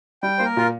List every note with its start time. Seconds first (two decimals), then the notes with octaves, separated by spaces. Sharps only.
0.23 G3 G5
0.38 A#3 C5
0.45 A#4
0.57 A#2 F4